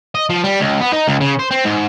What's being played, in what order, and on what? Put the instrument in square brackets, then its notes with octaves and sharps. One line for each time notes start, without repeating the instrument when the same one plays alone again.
[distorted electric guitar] D#5
F3
G3
C#2
B3
D#4
C#2
C#3
C5
C4
G#2